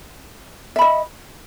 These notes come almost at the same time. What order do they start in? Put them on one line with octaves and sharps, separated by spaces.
E5 B5 D#5